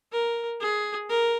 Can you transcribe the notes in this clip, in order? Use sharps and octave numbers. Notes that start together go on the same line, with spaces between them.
A#4
G#4
A#4